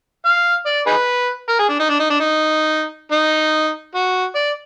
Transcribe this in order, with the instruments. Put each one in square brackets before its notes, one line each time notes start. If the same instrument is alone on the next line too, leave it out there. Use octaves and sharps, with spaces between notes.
[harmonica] F5
D5
D#4 G#4 B4
A#4
G#4
D4
D#4
D4
D#4
D4
D#4
D#4
F#4
D5